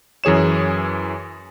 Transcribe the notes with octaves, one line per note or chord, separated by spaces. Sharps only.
F#2 E3 G#4 C#5 E7